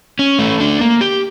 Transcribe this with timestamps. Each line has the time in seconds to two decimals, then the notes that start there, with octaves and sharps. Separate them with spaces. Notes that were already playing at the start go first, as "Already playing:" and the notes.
0.19 C#4
0.39 A3
0.61 D4
0.81 A#3
1.01 G4